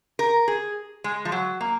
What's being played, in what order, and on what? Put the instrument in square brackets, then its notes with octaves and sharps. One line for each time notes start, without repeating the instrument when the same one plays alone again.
[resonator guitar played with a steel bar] A#4
G#4
G#3
F3
F#3
A#3